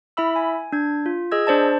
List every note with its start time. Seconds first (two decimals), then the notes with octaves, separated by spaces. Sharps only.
0.17 E4 E5 B5 E6
0.36 G#5
0.72 D4 G#6
1.06 F4
1.31 G#4 D#5 E6 G#6
1.47 D4 C5 D5 A5